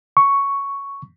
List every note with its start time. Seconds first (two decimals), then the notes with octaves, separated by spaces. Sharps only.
0.17 C#6